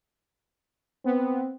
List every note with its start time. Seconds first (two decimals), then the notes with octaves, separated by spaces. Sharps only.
1.05 B3 C4